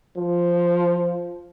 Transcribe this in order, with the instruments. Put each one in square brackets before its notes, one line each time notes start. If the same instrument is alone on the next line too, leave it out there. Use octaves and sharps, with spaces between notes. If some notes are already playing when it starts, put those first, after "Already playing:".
[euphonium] F3